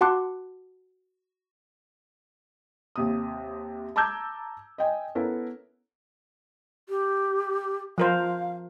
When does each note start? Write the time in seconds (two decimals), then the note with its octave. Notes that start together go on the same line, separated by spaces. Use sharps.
0.01 F#4 F#5 A5 C6 D6 F#6
2.96 D#2 C3 D#6
3.96 A5 A#5 D6 E6 G6 G#6
4.78 D#5 G5 G#5
5.15 B3 C#4 E4 A4 A#4
6.89 G4
7.98 F3 A#4 C5 F5